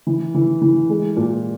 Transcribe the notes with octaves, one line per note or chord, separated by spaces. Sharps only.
E3
E3
E3
G#3
A#2